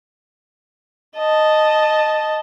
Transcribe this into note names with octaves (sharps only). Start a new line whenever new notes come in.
D#5 A5